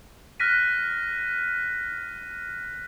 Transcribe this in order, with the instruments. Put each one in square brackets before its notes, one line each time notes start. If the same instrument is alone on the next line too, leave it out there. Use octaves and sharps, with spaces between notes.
[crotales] F6 F#6 A#6 B6 D#7